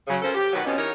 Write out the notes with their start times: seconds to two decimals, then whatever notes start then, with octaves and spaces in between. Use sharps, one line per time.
0.08 C#3 F#3
0.22 C#4 F4 A4 A#4 C5
0.34 G4
0.53 B2 D#3 F#3 G4 B4 F#5
0.64 F2 B2 C#4
0.77 E3 D#4 A#4 C#5